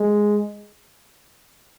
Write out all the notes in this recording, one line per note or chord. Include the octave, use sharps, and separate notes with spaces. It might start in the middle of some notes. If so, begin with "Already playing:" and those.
Already playing: G#3